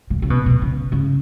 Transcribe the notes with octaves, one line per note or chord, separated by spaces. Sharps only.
C#3
C#3
B2
B2
C#3
C#3